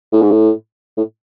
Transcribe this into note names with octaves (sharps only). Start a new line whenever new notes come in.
A2
G#2
A2
A2